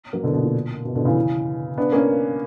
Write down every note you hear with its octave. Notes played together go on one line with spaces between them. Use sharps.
F#3 A#3
B2 D3
B2
A#2
B2
B2 D3
C#3 E3
B3 D4
A#3 C#4